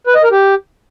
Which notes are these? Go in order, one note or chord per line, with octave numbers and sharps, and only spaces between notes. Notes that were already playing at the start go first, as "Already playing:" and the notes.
B4
D#5
A#4
G4